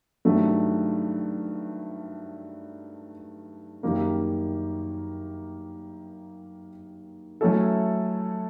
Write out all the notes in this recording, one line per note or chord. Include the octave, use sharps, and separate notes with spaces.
G2 D#3 F#3 A3
F#2 D#3 G3 A#3
F#3 A3 C#4 E4 A4